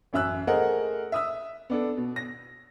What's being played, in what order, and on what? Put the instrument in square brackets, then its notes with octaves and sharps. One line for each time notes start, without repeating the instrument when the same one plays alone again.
[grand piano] A1 F#2 E5 E6 F#6
A3 G#4 A#4 C5 D#5 F#5
E5 D#6 E6
B3 D4 A4
B2
A#6